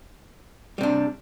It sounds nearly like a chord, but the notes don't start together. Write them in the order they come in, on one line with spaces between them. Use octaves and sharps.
G3 C3 D4